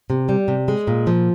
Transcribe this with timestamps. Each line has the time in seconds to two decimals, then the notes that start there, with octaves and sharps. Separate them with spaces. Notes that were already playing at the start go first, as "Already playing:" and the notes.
0.10 C3
0.29 G3
0.48 C3
0.68 G#3
0.87 A#2
1.07 F3